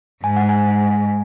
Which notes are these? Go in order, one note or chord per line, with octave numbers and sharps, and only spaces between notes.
G#2 G#5
F#5
G#5